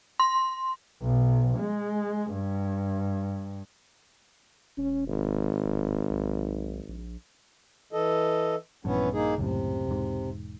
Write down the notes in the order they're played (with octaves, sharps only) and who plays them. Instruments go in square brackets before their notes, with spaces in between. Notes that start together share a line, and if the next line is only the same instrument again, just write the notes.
[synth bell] C6
[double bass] B1
G#3
G2
[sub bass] E1 [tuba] C#4
[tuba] G#1
[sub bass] D1
B1
A#1
[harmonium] E3 A4 D#5
[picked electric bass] A#1 G2 [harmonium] E3 B3 C#4
[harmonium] A#3 D#4 G#4
[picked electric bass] C#2 F#2 A2 [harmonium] C3
[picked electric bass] E1 G#2